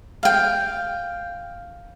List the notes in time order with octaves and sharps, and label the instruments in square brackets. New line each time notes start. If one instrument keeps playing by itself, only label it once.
[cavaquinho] F5 G5